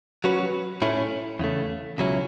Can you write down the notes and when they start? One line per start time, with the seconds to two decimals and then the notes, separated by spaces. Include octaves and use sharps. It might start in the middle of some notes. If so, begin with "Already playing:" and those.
0.24 F#3 C#4 F#4 B4
0.82 A2 A3 C#4 E4
1.39 E2 C#3 A3
1.98 C#2 B2 F#3 C#4 E4